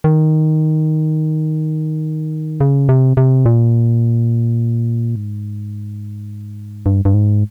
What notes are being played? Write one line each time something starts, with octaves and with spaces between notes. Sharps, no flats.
D#3
C#3
C3
C3
A#2
G#2
G2
G2
G#2